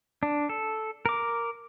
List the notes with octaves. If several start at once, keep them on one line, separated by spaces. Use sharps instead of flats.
D4
A4
A#4 D6